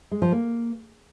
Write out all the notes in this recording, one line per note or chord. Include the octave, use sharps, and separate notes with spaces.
G#3
F3
A#3